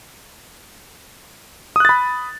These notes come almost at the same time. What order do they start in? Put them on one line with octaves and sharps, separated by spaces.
D#6 F#6 A6 B5